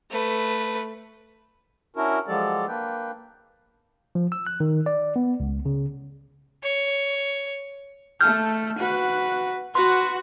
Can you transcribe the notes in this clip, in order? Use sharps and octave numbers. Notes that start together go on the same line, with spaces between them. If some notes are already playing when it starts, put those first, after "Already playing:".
A3 B4
C#4 D4 E4 F#4 A#4
F3 F#3 G#3 G4 A4 D5
A#3 D4 B4 G5
F3
E6
F#6
D#3
D5
B3
C#2
C#3
C#5
A3 A4 F6 G6
F#4 B4
F#4 B4 C6